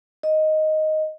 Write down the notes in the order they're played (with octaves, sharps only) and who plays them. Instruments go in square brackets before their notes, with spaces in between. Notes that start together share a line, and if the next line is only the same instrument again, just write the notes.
[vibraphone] D#5